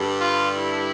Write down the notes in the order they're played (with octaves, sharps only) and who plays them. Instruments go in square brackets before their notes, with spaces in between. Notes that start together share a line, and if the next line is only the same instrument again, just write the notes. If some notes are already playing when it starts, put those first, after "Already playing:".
Already playing: [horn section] G2 D3 G3
F4
E4